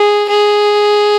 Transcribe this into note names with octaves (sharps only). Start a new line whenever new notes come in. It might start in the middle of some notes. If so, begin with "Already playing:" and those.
Already playing: G#4
G#4